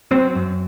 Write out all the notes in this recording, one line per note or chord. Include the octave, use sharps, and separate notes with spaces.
F#3 C4 C5
F#2